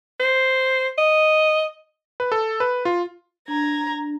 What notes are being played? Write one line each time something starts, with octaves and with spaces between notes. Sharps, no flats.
C5
D#5
B4
A4
B4
F4
D4 A#5 G#6